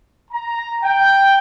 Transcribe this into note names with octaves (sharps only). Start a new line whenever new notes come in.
A#5
G5